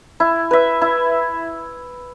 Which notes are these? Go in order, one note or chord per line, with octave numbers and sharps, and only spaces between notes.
E4
B4 E5
E4